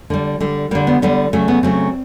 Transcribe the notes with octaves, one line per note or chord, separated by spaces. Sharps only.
D3 G3 A#3
D3 G3
D3 G3 A#3
B3
D3 G3 B3
C#3 F#3 A3
B3
C#3 F#3 A3 C4